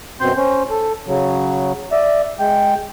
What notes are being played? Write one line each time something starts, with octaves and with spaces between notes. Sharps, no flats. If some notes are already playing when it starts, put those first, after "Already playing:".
F#2 B2 C4 C6 G6
C#4 C5
A4
C#3 F#3
D5 E5
G#3 G5